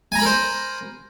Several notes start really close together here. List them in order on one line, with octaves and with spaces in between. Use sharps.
G#5 A#5 B5 A#4 C5